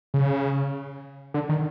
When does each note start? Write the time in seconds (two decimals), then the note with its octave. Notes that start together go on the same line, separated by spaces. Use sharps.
0.14 C#3
1.34 D3
1.49 D#3